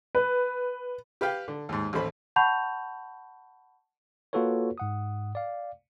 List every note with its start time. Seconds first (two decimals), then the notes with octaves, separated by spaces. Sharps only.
0.15 B4
1.21 G4 B4 F5 G5
1.48 D3
1.69 D#2 G#2
1.93 A1 D#2 A3 C5 B5
2.36 F#5 A5 B5 C#6 G6 F7
4.33 A#3 F4 F#4 A4 B4 C#5
4.78 G#2 F#5 D#6
5.35 D5 F5